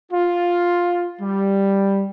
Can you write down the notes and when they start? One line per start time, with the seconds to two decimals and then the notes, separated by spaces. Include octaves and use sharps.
0.11 F4
1.20 G3